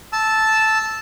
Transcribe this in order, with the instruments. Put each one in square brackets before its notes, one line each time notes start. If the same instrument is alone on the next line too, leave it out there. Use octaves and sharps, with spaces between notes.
[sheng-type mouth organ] A5 E6